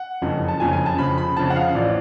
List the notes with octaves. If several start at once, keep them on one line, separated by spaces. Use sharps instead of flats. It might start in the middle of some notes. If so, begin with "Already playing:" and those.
Already playing: F#5
F#1 F2 C#3
A5
F#1 F2 C#3 G#5
G#5
A5
F2 C#3 F3 B5
B5
F2 C#3 F3 A5
F#5
F5
A1 F3 D5